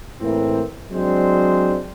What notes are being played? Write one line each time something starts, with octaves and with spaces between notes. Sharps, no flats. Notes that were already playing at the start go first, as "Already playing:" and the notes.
A2 E3 A#3 C4
F#3 G#3 C4 D4 C5